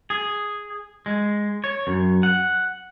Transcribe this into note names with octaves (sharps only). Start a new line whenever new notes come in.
G#4
G#3
C#5
F#2
F#5